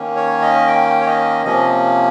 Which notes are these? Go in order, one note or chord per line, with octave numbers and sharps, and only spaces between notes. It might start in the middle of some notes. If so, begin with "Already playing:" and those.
Already playing: D#3 A#3 C#4
C#5
D#5
G5
C#5
D#5
C3 F3 A#3 C#4 D#5